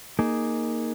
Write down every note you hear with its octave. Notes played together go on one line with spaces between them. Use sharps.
A#3 D#4 G#4